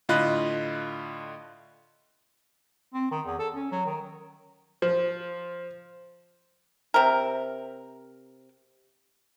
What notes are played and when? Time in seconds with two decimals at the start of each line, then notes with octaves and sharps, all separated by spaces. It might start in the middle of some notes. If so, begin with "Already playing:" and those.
0.09 A2 D3 F4 D#5 B5 F#6
2.93 C4
3.11 D#3
3.26 E2
3.39 A4
3.54 C#4
3.72 F#3
3.86 D#3
4.82 F3
6.94 C3 A#4